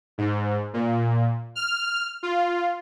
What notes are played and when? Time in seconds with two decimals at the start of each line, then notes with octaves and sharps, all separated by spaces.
0.18 G#2
0.74 A#2
1.55 F6
2.23 F4